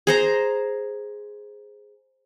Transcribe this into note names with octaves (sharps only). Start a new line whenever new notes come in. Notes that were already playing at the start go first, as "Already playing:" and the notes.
G#4 C5 A#5